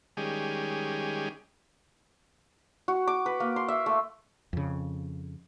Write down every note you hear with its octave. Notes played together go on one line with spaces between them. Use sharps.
D#3 G3 G#3 C#4 G4 G#4
F#4
D6
B4
A#3
C6
E5
A3
F2 C#3